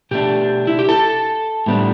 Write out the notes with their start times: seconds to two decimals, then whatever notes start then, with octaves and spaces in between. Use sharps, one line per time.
0.11 B2 A3 D4 G4
0.67 E4
0.79 G4
0.89 A4
1.66 A2 G3 B3 D4